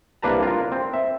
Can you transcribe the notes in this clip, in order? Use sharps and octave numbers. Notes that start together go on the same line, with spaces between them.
C2 A#3 D4 B4 A5 A#5
F4 A#4
C4
E5